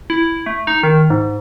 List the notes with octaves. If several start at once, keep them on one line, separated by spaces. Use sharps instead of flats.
E4
A3
D#4
D#3
G#2